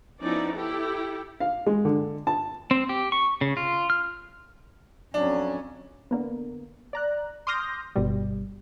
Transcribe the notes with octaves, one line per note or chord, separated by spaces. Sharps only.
F3 B3 C#4 D#4 E4 D5
E4 G4 A4
F5
G#3
D3
A5
C4
G4
C#6
C#3
F4
F6
F2 F#3 C#4 D4
D3 A#3 B3
D5 A#5 F#6
C6 D6 D#6 F6 G6 A#6
G1 B2 G3